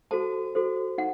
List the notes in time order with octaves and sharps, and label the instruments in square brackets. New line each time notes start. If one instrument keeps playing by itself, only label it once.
[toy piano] F#4 A4 C5 A5
F#4 A4 C5
D#4 F#5